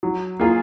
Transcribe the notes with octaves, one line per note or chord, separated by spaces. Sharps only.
F#3
A#3 F4 G#4